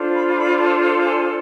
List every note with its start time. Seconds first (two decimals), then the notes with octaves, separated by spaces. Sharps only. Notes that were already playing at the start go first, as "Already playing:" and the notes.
Already playing: D4 F4 A4 C5
0.13 B5
0.37 B5
0.59 A5
0.83 F5
1.05 G#5